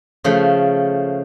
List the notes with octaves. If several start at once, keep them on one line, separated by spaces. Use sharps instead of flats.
C#3 F3 A3